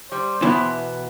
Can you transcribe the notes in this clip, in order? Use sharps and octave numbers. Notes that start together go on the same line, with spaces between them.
G3 C5
E2 B2 E3 B3 E4